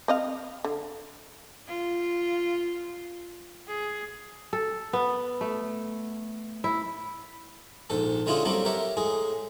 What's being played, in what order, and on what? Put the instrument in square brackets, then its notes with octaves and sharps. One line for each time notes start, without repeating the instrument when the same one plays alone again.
[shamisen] C4 D#5 F5
D3
[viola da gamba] F4
G#4
[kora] A4
B3
A3
E4
[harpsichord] A#1 G#2 A4
D3 G#3 C#4 E4 F4 G#4
F#3 G3 A3 A#3 C4 E4
G4 A#4 C#5 E5
A2 G#3 G#4